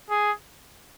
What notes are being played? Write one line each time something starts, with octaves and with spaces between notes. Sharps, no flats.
G#4